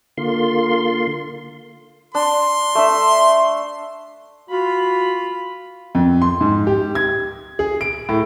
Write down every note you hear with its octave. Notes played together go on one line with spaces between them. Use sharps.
D3 A#3 F4 C6
D4 C6
A3 D4 E5
F4 F#4 B5
F2
C6
G#2
G4
G#6
G#4
D7
A2